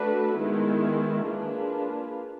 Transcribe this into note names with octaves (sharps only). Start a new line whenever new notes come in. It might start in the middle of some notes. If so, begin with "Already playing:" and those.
Already playing: A3 D4 F#4 B4
D#3 G#3 B3 E4
A#3 D4 F4 G#4 B4